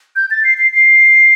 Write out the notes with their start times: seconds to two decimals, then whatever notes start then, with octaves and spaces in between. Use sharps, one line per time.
0.16 G6
0.31 A6
0.44 C7
0.58 C7
0.73 C7